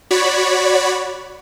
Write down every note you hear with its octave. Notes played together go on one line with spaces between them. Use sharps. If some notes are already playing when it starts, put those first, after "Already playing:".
F#4 C#5 D5 B5